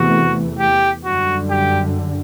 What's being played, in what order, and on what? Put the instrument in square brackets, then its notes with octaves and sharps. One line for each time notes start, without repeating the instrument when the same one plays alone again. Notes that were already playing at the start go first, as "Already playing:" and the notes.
Already playing: [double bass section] E2 C3 E3 A3 [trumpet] F#4
[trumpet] G4
[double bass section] F#2 D3 G3 [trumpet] F#4
[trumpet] G4